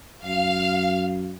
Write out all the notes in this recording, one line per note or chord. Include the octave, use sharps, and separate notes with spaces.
F#2 F5